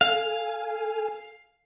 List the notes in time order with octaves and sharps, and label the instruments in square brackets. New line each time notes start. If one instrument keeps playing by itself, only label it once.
[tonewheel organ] A4 G#5 [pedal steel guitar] F5